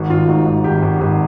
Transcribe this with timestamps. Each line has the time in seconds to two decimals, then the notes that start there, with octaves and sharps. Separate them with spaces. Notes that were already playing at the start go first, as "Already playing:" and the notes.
Already playing: G#1 F#4
0.10 G#1 F4
0.28 G#2 F#4
0.46 G#2
0.64 G#1 G4
0.82 G#1
1.01 G#1